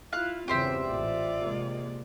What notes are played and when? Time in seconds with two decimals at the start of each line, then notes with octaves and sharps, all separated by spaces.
0.13 E4 F4 F5 F#6
0.48 E2 G2 C#3 C4 G4 C5 E5
0.86 A1 A#2 F4 D5
1.41 C3 G#3 A#3